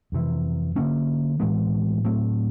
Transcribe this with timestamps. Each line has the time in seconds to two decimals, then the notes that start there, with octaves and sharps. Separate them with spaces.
0.12 F2 C3 E3
0.76 D3 F3 A#3 C#4
1.40 A2 E3 G#3 B3
2.04 A2 F#3 A3 C4